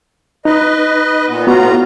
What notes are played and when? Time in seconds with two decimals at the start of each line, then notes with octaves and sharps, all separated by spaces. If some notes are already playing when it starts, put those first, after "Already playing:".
0.45 D#4 B4 D#5
1.28 A#2 B3
1.47 A2 B3 F4 F#4 A#5